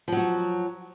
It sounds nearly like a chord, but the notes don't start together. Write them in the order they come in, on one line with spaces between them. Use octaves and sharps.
F3 F#3 F#4